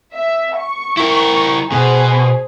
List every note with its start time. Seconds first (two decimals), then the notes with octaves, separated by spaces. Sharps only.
0.14 E5
0.59 C#6
0.97 E4 A#4
1.72 B2 G#4 C5